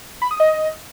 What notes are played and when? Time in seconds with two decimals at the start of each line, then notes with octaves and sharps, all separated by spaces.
0.22 B5
0.31 D#6
0.40 D#5